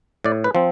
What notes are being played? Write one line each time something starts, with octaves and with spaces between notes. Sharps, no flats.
A2 D5
B4
F3 C4